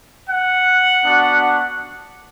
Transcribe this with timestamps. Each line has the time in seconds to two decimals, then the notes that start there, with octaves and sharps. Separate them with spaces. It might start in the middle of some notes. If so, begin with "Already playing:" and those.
0.27 F#5
1.04 B3 D4 F#4